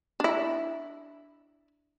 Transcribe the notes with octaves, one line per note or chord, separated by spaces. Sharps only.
D4 E4